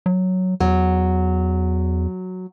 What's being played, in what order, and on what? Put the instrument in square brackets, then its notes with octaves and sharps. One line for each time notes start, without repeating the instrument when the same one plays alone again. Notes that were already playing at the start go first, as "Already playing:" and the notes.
[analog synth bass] F#3
[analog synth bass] E2 [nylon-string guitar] F#3